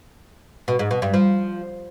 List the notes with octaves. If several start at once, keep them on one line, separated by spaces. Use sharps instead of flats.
B2
G#2
B2
G2
F3